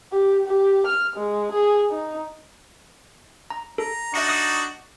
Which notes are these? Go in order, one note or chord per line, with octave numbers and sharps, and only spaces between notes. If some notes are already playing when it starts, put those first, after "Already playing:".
G4
G4
F6
G#3
G#4
D#4
A#5
A4 A#5
D4 D#4 F#4 E5 A#6 C#7
D#6 F#6